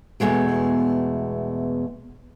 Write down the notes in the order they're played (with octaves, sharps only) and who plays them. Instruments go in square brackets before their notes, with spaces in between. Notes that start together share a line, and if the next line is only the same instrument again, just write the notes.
[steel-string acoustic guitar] E2 B2 G#3 A3